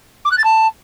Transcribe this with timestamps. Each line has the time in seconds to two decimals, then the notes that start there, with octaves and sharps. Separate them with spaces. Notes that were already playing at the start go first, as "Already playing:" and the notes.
0.25 D6
0.31 F#6
0.38 A6
0.44 A5